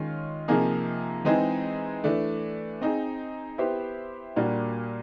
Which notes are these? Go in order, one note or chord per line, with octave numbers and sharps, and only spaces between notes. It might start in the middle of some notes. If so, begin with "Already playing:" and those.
Already playing: D#3 G#3 C#4 F4
C3 F3 A#3 D#4 G#4
E3 G#3 C4 D#4 G#4
E3 A3 D4
C4 D#4 G#4
B3 E4 G4 C5
A#2 G3 A#3 D4 F#4